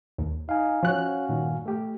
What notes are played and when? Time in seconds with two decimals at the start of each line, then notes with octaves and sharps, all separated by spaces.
0.18 D#2
0.49 D#4 F5 G#5
0.83 F3 C#4 F#4 C#5 F#6
1.29 G2 A#2 D#3
1.66 A3 G4